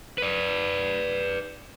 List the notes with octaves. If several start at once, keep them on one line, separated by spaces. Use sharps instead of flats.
B4 D5